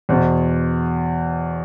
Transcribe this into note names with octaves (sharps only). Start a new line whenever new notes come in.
E2 B2 C5